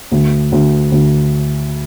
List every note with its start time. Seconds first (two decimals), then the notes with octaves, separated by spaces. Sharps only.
0.12 D2
0.52 D2
0.92 D2